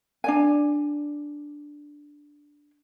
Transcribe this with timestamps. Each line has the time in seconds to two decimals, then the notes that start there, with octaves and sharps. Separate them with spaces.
0.24 D4 D5 G#5